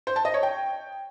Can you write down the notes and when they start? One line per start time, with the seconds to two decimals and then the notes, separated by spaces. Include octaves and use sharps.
0.07 C5
0.16 A5
0.25 D#5
0.34 C#5
0.43 G5